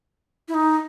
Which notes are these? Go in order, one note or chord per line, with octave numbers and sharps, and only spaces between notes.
E4
D#4